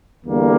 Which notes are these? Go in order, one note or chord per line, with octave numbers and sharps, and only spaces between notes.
E2 D3 G3 A#3